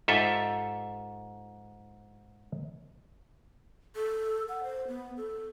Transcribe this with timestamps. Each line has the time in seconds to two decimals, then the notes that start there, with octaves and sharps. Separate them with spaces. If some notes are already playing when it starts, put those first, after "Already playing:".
0.08 G#2 F4 G4 A4 E5
3.96 A4
4.49 F#5
4.64 C5
4.87 B3
5.17 A4